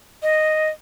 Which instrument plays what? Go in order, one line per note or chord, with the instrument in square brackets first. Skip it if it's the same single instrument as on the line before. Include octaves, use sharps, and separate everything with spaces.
[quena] D#5